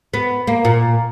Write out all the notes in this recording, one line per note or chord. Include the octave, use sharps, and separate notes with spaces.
B3
A#3
A#2